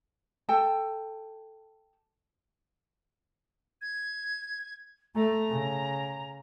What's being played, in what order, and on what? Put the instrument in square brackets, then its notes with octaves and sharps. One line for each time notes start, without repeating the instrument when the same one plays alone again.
[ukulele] A4 G5 A5
[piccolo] G#6
[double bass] A3 [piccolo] A#5
[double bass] C#3